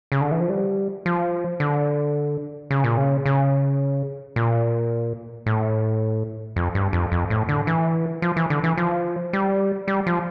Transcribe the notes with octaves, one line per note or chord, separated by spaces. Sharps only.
C#3
D3
E3
F3
G3
F3
D3
C#3
A#2
C#3
C#3
A#2
A2
F2
G2
F2
F2
A2
D3
E3
F3
E3
D3
E3
F3
G3
G3
F3